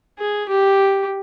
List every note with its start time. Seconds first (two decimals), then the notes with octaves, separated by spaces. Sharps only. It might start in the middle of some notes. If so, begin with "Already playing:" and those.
0.18 G#4
0.49 G4